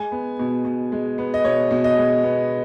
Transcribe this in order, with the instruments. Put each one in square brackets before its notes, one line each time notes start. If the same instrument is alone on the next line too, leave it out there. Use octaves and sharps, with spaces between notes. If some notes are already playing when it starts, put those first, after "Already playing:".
Already playing: [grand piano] G#3 G#5
B3
B2
B2
G#3
B3
D#5
B2 C#5
B2
D#5
G#3
B3